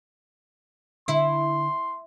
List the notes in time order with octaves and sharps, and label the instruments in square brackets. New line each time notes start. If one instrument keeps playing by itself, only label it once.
[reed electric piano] D3 [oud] E4 [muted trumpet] C6